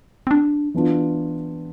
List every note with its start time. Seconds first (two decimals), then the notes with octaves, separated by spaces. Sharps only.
0.27 C4
0.31 D4
0.74 E3 B3 D4 F4